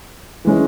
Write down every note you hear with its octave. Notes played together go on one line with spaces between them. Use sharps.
E3 G#3 C#4